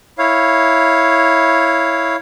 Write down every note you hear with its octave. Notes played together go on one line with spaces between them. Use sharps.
E4 C#5 F5